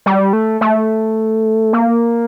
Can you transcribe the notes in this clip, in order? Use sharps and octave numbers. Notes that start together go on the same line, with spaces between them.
G3
A3
A3
A#3